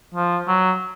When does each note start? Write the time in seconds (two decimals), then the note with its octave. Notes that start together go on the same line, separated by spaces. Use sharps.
0.14 F3
0.47 F#3